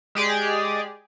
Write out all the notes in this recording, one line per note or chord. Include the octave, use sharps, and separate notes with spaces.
G#3 G4 G#4 D5